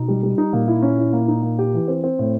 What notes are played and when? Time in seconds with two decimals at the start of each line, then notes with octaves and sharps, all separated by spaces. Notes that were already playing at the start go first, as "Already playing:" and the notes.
Already playing: B2 D#4
0.08 G3
0.23 G3
0.38 D#4
0.53 A#2 A#3
0.68 E4
0.82 C#4
0.98 E4
1.13 A#3
1.28 D#4
1.43 A#3
1.59 G4
1.74 E3
1.88 C4
2.04 C4
2.19 A2